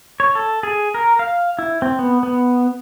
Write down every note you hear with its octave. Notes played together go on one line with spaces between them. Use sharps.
C#5
A4
G#4
A#4
F5
E4
C4
B3
B3